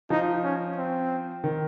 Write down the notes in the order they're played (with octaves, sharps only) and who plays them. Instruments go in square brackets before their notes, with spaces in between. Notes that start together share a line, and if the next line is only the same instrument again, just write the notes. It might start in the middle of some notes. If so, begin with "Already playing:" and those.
[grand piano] F3 [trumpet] D#4
[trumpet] C#4
C4
[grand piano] D#3